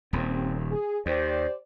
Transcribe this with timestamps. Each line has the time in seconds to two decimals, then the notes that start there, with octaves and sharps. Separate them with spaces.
0.13 D#1 D#2 C4
0.71 G#4
1.06 D#2 G4 C5 D5